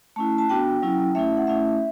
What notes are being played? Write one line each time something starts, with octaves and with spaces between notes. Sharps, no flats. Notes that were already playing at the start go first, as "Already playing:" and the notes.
A3 C#4 E4 A5
A5
B3 D4 F#4 G5
F#3 C#4 E4
A3 C#4 E4 E5
F#5
A3 C#4 E4 E5